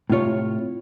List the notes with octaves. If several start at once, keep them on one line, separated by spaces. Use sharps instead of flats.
A2 C3 F4 C#5